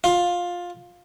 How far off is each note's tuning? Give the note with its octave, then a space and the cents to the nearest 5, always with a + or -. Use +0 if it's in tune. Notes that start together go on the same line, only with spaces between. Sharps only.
F4 +15